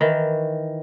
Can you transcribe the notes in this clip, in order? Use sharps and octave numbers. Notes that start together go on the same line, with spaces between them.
D#3 E3